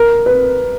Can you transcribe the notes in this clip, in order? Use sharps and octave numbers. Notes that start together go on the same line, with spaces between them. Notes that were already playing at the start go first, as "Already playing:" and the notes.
Already playing: A#4
B4